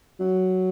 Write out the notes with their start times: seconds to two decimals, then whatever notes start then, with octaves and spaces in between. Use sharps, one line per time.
0.20 F#3